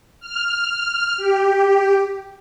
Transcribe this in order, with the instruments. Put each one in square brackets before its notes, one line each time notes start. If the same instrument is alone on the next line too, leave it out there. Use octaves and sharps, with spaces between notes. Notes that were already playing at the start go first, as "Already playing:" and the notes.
[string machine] F6
G4